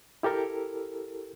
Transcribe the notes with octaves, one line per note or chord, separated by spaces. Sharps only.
E4 G4 A4 A#4